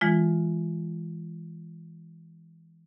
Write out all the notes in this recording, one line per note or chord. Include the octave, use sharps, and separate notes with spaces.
E3 G#3 F4